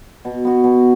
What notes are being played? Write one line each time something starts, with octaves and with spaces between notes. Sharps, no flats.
B2
B3 F#4
B2